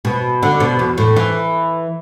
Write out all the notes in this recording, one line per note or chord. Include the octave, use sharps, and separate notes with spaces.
B2
D3
B2
E2
A2
E3